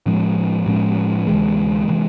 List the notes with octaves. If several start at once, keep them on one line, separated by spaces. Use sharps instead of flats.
A2 F3 G#3 C#4
A2 F3 G#3 C#4
D2 C3 E3 G#3
C3 E3 G#3